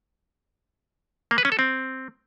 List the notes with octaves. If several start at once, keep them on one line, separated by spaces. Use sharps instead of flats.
A#3
B4
C#4
A4
C4